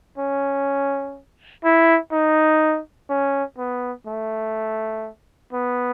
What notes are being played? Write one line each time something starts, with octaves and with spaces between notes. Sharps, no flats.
C#4
E4
D#4
C#4
B3
A3
B3